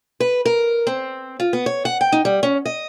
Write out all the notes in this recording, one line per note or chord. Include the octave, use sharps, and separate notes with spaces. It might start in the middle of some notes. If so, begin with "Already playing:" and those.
B4
A#4
C4
F4
B3
C#5
F#5
G5
D#4
G3
C#4
D#5